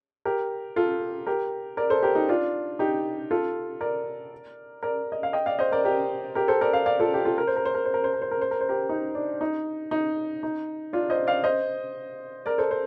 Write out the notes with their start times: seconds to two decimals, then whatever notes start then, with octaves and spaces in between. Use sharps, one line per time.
0.25 G4 A#4
0.76 F4 A4
1.27 G4 A#4
1.77 A#4 D5
1.90 A4 C5
2.03 G4 A#4
2.15 D#4 G4
2.29 D4 F4
2.79 D#4 G4
3.31 F4 A4
3.81 A#4 D5
4.83 A#4 D5
5.12 D#5
5.23 F5
5.33 D#5 G5
5.46 D5 F5
5.59 C5 D#5
5.72 A#4 D5
5.85 G4 A#4
6.35 G4 A#4
6.48 A4 C5
6.61 A#4 D5
6.73 D5 F5
6.86 D5 F5
7.00 F4 A4
7.14 G4
7.25 F4 A4
7.38 A#4
7.47 C5
7.56 A#4
7.65 C5
7.75 A#4
7.85 C5
7.94 A#4
8.04 C5
8.13 A#4
8.22 C5
8.31 A#4
8.41 C5
8.51 A#4
8.61 C5
8.69 G4 A#4
8.89 D#4
9.15 D4
9.41 D#4
9.91 D#4
10.43 D#4
10.93 D4 F4
11.10 C5 D#5
11.27 D5 F5
11.44 C5 D#5
12.46 A#4 D5
12.58 A4 C5
12.71 C5